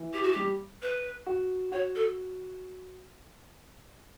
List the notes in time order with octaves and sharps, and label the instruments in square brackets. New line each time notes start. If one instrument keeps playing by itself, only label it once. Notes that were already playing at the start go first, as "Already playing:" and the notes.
Already playing: [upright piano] E3
[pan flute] G4
F#4
[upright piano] G3 [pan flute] G4
[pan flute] B4
[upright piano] F#4
[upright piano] F#4 [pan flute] C#5
[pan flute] A4